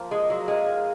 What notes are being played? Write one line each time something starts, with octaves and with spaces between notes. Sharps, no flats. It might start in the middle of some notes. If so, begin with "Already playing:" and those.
Already playing: F3 A#3 F4
G#3
F#3
G#3 C4 D#4 A#4 F5